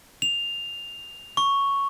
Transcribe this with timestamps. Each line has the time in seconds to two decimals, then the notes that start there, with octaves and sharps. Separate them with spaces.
0.22 F7
1.37 C#6